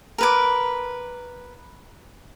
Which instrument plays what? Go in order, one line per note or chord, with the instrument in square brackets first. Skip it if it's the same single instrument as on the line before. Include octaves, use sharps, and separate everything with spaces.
[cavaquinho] A#4 B4 D6